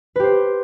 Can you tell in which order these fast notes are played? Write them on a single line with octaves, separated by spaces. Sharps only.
B4 G4 C5